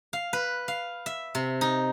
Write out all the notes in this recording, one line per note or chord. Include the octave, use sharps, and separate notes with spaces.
F5
B4
F5
E5
C3
D#4